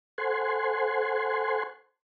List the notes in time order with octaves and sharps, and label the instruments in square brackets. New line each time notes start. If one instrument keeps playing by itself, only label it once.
[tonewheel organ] A4 C5 F#5 G#5 C6